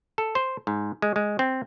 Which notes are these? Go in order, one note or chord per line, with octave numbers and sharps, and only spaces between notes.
A4
C5
G#2
G#3
G#3
C4